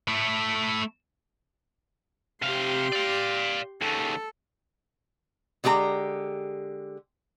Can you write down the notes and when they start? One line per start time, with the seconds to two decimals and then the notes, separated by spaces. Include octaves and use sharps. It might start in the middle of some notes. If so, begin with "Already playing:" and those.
0.08 A3 E4
2.42 C3 G4 F5 C6
2.93 D5 F5
3.81 D#2 C#3 A4
5.64 D3 G#3 G4 A4 A#5